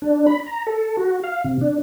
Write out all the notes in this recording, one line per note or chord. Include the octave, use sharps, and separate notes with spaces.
D4
B5
A#5
A4
F#4
F5
C3
D4